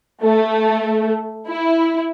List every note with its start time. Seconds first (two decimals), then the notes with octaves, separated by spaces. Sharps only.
0.23 A3
1.48 E4